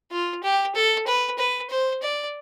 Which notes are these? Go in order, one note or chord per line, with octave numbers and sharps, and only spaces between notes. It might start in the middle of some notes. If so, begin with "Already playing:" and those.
F4
G4
A4
B4
B4
C5
D5